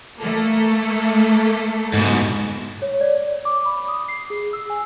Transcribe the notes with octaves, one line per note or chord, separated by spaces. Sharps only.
A3 A#3 A4
G#2 B2
C#5
D5
D6
B5
D#6
C7
G#4
E6
G#5